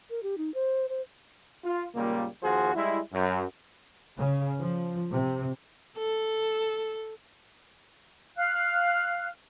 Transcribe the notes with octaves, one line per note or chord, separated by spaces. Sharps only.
A#4
G4
D#4
C5
C5
F4
C#2 A#2 G3 A#3
D#2 F3 F#4 G#4 C5
G3 G#3 E4
F#2
C#3
F3
C3
A4
F5 F6 F#6